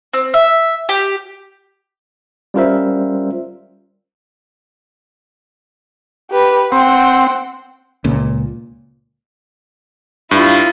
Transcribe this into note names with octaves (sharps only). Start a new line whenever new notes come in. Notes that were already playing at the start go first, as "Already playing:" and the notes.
C4
E5
G4
G3 C#4 F4 A#4 C5 E5
G4 B4
C4 F#5 G5
C#2 A#2
G2 E4 F4